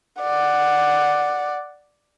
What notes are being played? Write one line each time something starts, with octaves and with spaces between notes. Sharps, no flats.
D5 F#5